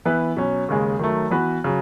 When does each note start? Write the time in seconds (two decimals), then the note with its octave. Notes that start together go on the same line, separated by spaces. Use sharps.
0.05 E3 B3 E4 B4
0.36 B2 F#3 C#4
0.69 D#2 C#3 G#3
0.99 D#3 F#3 A3
1.31 E3 B3 F#4 B4
1.64 C#3 F#3